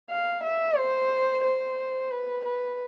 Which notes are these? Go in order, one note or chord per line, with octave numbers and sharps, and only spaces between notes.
F5
E5
C5
C5
B4
B4